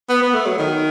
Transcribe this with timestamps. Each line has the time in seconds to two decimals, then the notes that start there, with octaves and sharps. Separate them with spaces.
0.09 B3
0.22 B3
0.34 A3
0.46 F#3
0.59 D#3